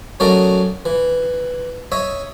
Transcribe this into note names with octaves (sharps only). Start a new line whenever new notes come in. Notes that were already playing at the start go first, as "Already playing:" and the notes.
F#3 A3 C#4 A#4 D5 D#5
E3
C#5 D#5 E5